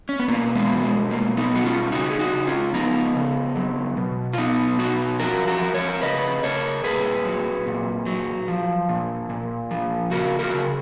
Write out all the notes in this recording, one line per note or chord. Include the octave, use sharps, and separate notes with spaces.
C#4
B3
B2 A#3
G#3 B3
F#3
G#3
B2 A#3
B3 D#4
B2 F#4
C#4 F4
C#3 D#4 F#4
G#4
D#4 F#4
C#3
C#4 F4
F3 B3 D#4
C#3
F#3
B2
F4
B2 B3 D#4
B2 D#4 F#4
F3 F#4 A#4
F#4 A#4
F3
A#4 C#5
C#3 B4 D#5
C#3 A#4 C#5
A#2 G#4 B4
F#3
A#2
F#3
F3
A#2
A#2
F3
C#3 F#4 A#4
F#4 A#4
C#3